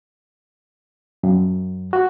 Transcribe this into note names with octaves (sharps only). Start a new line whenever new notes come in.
F#2
F#4